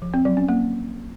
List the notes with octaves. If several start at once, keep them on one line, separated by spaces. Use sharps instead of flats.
F3
C4
F#3
C#4
A#3